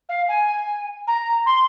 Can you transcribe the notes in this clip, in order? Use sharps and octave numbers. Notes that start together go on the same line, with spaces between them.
F5
G#5
A#5
C6